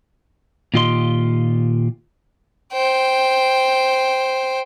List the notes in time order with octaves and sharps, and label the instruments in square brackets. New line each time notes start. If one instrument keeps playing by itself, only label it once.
[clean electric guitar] A#2 D#3 F4 G4 D#5 C6
[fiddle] C5 G5